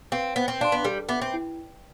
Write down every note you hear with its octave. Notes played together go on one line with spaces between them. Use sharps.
C4 B4 F5
B3 C5
C4
D4 F5 C6
B3
G3 A4
B3 E5 B5 D6
C4
E4